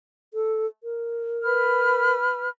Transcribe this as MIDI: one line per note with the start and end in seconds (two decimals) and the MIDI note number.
0.34 0.66 69
0.84 2.16 70
1.44 2.48 71
1.44 2.48 83
1.44 2.48 89